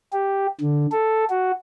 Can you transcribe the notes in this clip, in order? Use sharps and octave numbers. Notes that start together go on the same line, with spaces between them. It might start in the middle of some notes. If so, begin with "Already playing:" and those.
G4
D3
A4
F#4